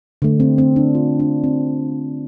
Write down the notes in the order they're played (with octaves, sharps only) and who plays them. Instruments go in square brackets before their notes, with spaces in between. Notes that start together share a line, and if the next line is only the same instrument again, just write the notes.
[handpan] D3 A3
C4
C4
D4
F4
D4
C4